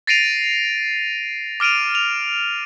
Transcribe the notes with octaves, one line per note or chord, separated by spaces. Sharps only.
A6 A#6 C7 D7 D#7 F7
D6 F6 D7 D#7 F7
F7